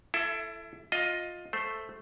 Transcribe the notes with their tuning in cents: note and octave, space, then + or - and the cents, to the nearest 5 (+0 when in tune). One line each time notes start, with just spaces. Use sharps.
E4 +30 A4 +0 E5 +0
F4 +15 D#5 +5
A3 +0 C5 +0